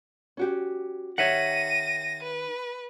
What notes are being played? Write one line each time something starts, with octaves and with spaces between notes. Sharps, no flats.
C#4 F#4 G4
D#3 D#4 G4 C#5 E5 F#5 A#6 D#7
B4